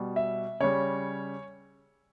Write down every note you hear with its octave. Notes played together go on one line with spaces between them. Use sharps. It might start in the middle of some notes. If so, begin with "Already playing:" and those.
Already playing: B2 G3
E5
C#3 G3 C#5